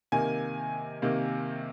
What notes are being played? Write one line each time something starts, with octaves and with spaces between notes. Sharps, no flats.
C3 D#3 A#3 G#5
C3 D#3 A#3